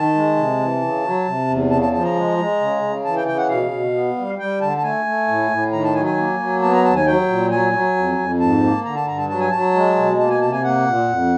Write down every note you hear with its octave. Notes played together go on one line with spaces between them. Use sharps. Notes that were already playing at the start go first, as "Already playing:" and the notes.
Already playing: D#3 A5
G#3
C3
E3
C#3
F#3
C3
E2
C#3 A5
A5
F3 A5
A#5
G#3
G#3
C#3
C#3
E3 A5
G5
C#3 G5
F#5
B2 F5
B2
B3
G3
G3 G5
D3 A5
A5
A3 G#5
A3
A2
A2
D#3 A#5
A5
F#3 G#5
G#5
A#3
F#3
B3 A5
A#5
D#2 A5
G#5
F#3 G5
A#2
F#3 G#5
F#3
F2
F2
G#2 A5
A#3
D3 A#5
A5
G2 A#5
A5
F#3 A5
G#5
F#3 A5
G#3
B2
A#3 A5
G#5
C3 A5
G#5
A#3 F#5
A#2
F2